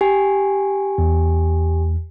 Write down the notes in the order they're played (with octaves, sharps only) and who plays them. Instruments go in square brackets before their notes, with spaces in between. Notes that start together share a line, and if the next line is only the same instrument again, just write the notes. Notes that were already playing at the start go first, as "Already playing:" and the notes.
[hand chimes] G4 G#5
[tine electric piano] E2